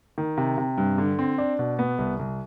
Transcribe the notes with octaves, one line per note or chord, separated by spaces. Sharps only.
D#3
C3
C3
G2
D3
C4
D4
B2
B3
C2
C2